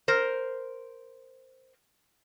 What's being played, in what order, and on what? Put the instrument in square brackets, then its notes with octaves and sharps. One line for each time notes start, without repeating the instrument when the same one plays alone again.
[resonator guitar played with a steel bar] A#4 C5